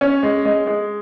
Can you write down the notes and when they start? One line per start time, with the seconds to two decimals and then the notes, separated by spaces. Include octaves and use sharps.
0.01 C#4
0.23 G#3
0.45 G#3
0.67 G#3